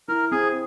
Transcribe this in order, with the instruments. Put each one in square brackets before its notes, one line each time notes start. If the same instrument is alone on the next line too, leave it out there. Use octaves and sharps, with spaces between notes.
[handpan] E4 [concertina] A#4
[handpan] C4 [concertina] G#4